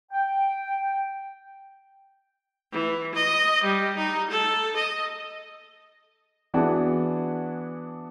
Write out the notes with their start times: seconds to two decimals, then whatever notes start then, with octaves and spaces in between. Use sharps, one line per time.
0.11 G5
2.73 E3
3.15 D#5
3.63 G3
3.97 D#4
4.30 A4
4.77 D#5
6.54 E3 B3 D4 F#4 G#4